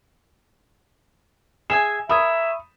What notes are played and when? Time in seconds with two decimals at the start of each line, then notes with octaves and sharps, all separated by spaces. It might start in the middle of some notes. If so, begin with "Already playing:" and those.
1.70 G#4 E5 G#5 E7
2.09 A#4 C#5 E5 B5 D#6